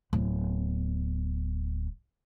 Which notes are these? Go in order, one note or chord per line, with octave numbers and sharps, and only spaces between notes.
D1 B3